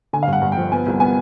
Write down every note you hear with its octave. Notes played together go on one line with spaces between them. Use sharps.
D3 G#5
F5
G2
F#5
G2
G5
F3
B3 G#5
C2
B3 G#5